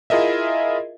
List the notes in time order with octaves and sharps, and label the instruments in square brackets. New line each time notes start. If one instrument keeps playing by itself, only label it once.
[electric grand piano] E4 F4 G#4 A#4 D#5 E5